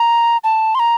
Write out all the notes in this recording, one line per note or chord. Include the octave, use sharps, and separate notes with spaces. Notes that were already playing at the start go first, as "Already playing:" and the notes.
Already playing: A#5
A5
C6
A#5